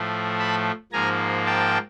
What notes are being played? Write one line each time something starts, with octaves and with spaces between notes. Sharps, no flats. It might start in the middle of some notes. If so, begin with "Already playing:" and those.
Already playing: A2 F3 A3
A5 B5
G#2 F3 A#3 G#5 A#5
G5 A5